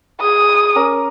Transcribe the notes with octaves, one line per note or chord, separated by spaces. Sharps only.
G#4 D#6
C#4 A#4 D6